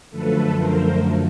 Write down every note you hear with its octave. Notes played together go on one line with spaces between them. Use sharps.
F#2 D3 F3 A3 A4 B4
A#4 C5